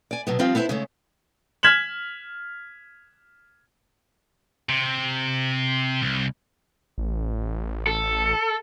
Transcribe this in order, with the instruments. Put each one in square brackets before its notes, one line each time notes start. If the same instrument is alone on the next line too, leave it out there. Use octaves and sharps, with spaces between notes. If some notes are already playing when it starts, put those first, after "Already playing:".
[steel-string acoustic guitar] D5 G#5
B2 F#3 B3
F3 G3 C4 F4 D#5 F5
B3 E4 C5 D#5 E5 A5
C#3 G#3 A3
[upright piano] F6 G#6 B6 E7 F#7
[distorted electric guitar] C3
C2
[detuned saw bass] A1
[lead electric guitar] A4